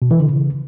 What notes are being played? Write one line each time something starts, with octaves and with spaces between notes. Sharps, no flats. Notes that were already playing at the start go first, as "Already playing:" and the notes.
B2
E3
D3
C#3